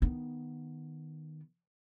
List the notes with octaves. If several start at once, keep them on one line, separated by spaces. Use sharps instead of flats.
D#3 B3